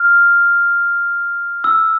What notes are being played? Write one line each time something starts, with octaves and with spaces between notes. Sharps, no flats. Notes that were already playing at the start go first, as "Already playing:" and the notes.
Already playing: F6
E6